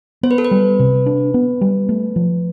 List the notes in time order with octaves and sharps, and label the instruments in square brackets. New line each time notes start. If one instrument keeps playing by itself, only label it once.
[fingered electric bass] B3 [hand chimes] C5
[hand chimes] B4
A4
B4
[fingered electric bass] G3
C3
D4
B3
G3
A3
F3